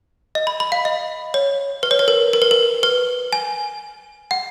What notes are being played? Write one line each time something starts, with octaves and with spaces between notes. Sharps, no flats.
D#5
B5
B5
F5
D#5
C#5
B4
C#5
B4
A#4
A#4
B4
A#4
B4
G#5
F#5